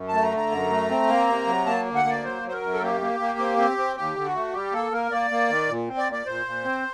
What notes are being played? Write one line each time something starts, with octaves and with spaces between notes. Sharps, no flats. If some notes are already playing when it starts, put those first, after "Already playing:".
Already playing: F#2
A5
A3
A#5
D3
A#5
F#2
A3
C4
A#3
C3
F#3
A#3 A5
D2
F#5
A#3 D5
F#3 C5
F#3
C5
A#4
F#2
A4
A#3 G4
A#3
A#3
C4
C4
C4
D#2 G4
D3
F#4
A3
G3 G4
A#3 A4
A#3 A#4
A#3 D5
A#3
D#3
A#2
C4
D5
A#2
D5
A#2 C5
A#2
C4